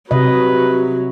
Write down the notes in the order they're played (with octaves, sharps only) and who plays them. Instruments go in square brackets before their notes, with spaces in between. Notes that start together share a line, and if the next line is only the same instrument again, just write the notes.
[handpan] C3 D#5 [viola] F#3 [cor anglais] B4